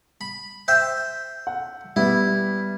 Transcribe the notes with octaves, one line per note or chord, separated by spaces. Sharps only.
B5
C5 E5 G5
F#5
G3 B3 E4